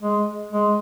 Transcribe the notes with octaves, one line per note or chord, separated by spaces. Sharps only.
G#3
G#3